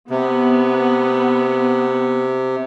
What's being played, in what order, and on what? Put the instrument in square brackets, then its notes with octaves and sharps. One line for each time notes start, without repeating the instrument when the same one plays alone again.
[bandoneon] C3 [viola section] B3